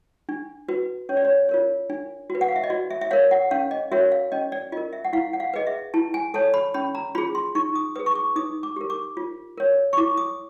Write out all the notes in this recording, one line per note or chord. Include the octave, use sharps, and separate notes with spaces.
D4
F#4 B4
C#4 C#5
D5
C#5
F4 A#4 C#5
D4
F#4
B4
F#5
F5
E5
D#5
F#4 D5
E5
E5
A#4 C#5 F5
F#5
C#4 F5
D#5
F#4 A#4 C#5 E5
F5
C#4 D#5
D5
F4 A#4 D#5
E5
F#5
E4 F5
F#5
F5
G#4 B4 D#5
E5
E4 A5
G#5
A4 C#5 A5
B5
C#4 B5
A#5
F4 G#4 B5
C6
D#4 C#6
D#6
G#4 B4 D#6
C#6
D6
D#4 D#6
D6
G4 A#4
D6
F4
A#4 C#5
C#6
E4 D6
D#6